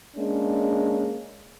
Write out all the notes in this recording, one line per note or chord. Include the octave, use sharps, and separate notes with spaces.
G#3 A#3 C#4 D4